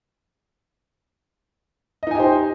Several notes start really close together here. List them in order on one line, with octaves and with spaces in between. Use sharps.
D#5 D#4 G#5 G4 C5